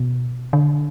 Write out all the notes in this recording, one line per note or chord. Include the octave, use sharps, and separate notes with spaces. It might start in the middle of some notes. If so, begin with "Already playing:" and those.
Already playing: B2
D3